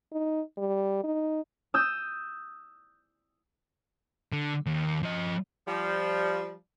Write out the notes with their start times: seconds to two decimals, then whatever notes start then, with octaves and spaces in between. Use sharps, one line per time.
0.12 D#4
0.57 G3
1.04 D#4
1.74 D#6 E6 G6
4.32 D3
4.66 D#2
5.03 F3 D#5
5.68 F3 G3